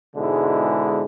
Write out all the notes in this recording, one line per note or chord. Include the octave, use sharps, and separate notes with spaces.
G#2 B2 D3 G#3 E4